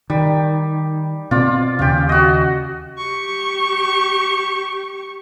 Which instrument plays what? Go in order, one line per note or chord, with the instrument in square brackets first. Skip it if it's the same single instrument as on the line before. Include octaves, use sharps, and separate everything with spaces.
[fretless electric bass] D#3 [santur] G3
[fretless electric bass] B2 C4 [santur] F4 D5
[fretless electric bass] D#2 C#3 [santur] F4 G4
[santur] F#4 D#5
[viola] G4 C#6